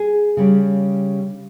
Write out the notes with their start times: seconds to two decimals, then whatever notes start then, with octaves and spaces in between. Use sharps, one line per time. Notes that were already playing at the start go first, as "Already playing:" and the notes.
Already playing: G#4
0.37 C#3 G3 C#4